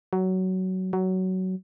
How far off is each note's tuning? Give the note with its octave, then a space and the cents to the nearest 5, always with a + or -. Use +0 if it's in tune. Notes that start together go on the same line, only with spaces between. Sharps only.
F#3 +15
F#3 +15